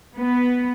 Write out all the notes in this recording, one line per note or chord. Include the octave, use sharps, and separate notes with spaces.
B3